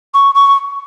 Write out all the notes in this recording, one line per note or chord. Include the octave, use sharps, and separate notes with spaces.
C#6
C#6